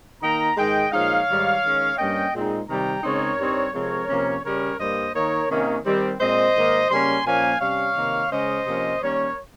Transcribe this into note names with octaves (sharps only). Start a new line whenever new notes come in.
D#3 A#3 D#4 G5 A#5
G#2 D#3 G#3 D#5 G5
A#2 F3 G#3 D#4 C#5 F5
G#2 D#3 G3
D#3 G#3 C#4
G2 G3 A#3 C#4 D#5 G5
A#2 G#3 C4 D#4
C3 D#3 G3 G5 A#5
C#3 G#3 C4 D#4 A#4 C#5
G2 G3 C4 D#4
C3 F3 G#3 C4 A#4 C#5
C3 F3 A#3 C#4
C#3 G3 C#4 A#4 C#5
G2 G3 A#3 C5 D#5
D#3 A#3 D#4 A#4 C#5
C3 D#3 A#3 C#4
D#3 G3 C4
A#2 G#3 C4 C5 D#5
G#2 D#3 A#3 D#4
C#3 G3 A#3 C#4 G#5 C6
A#2 F3 A#3 C#4 F5 G#5
C3 G3 C#4 C#5 F5
C3 D#3 A#3
C#3 G#3 C#4 C5 D#5
C3 F3 A#3 C#4
D#3 G3 A#3 C#4 A#4 C#5